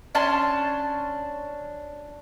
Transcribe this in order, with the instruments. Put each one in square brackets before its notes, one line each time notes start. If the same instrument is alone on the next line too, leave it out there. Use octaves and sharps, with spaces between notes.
[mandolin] C#4 D4 A5 C6